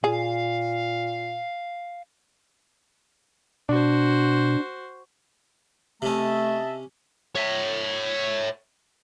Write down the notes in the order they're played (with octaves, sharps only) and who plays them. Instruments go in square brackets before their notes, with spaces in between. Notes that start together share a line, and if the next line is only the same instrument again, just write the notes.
[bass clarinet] A#2 [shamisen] G#4 [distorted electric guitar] F5
[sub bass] B2 [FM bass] D4 [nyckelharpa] F#4 C5
[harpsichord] C3 C#4 [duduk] A3 [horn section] D#5 E5 A5
[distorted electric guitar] C#5 E5